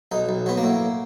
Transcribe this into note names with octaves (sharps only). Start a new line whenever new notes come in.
B1 D#4
B1
F#3 B3
A#3
A2